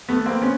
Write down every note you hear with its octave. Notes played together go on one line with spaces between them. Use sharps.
A3 B3
A#3 C4
B3 C#4